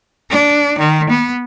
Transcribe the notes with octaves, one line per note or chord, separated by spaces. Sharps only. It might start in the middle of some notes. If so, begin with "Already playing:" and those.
D4
D#3
B3